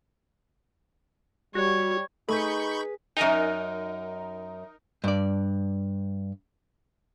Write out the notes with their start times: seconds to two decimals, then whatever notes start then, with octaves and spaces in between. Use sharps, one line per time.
1.55 G3 F#4 C#5
2.29 A3 D#4 G#4 A4 B4 B5 C#6 G6
3.17 F#2 D#4 A#4 G#5
5.04 G2 D5